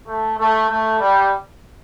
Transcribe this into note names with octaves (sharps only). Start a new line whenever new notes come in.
A3
A3
A3
G3